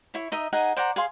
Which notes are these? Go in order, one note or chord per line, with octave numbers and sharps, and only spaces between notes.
E4 C#5
D#4 D#5 E5
D#4 G#4 F#5 G#5
C5 D5 F#5 A#5
G#4 F5 C6